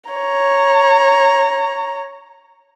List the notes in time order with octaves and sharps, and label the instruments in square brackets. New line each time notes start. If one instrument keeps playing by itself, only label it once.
[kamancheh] C#5 A#5